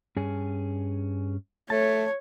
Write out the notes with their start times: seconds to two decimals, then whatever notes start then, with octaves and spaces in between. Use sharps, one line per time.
0.17 G2 C#4 G#4
1.70 A3 C#5 A5